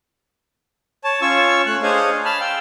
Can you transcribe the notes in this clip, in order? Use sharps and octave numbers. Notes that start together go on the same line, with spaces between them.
C#5 A5
C#4 F4 C#5 C#6 E6
A3 F#6
D4 G#4 C5 C#5 D#5 F5
A5 B5 F6
F5 G5 E6